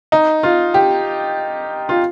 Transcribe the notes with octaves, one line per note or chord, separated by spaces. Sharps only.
D#4
F4
G4
F4